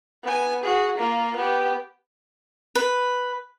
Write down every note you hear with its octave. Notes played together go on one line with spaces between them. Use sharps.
B3 G#5
F#4 G#4
A#3 F4
B3 G4
B4